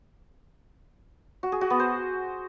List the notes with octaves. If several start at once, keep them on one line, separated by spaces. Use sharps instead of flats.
F#4
G#4
F#4
B3
C5